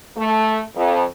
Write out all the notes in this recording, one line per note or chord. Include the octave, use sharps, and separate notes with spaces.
A3
F2